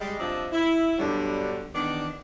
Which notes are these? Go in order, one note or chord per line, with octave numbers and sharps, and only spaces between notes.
G3 G#3
G2 C3 F3 D4 D#5 E5
E4
G2 B2 D3 F#3 G3
E2 D#3 B3 D4 D5 D#5